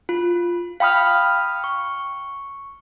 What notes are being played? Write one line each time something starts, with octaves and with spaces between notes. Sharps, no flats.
F4
F5 G5 B5 D#6 F6
C#6